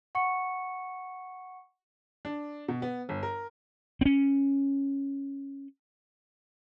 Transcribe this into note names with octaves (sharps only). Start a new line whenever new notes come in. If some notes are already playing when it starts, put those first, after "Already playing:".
F#5 C#6 C#7
D4
B2
B3
G1
A#4
C4 C#4